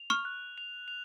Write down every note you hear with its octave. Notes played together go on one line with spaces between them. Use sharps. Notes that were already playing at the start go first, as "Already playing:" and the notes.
Already playing: F7
C#6 F6
F#6
F7
F7